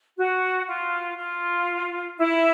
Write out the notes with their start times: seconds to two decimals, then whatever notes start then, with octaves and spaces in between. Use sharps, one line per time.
0.17 F#4
0.68 F4
1.17 F4
2.19 E4